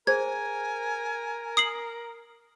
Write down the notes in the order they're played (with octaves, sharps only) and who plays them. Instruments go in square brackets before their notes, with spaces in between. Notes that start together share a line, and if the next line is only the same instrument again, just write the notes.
[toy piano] G#4 C5 [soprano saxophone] A#4 [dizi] G#5 [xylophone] G#6
[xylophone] D#6 C7 F#7